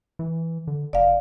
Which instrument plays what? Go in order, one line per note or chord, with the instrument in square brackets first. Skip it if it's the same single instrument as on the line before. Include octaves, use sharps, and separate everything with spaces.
[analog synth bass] E3
D3
[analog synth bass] F#1 [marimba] D5 F5